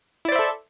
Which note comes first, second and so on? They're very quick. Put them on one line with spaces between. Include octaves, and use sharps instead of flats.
E4 D5 C5 E5 A4